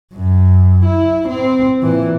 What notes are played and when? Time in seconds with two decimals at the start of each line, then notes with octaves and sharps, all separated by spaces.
0.14 F#2
0.85 E4
1.28 C4
1.83 A#2 E3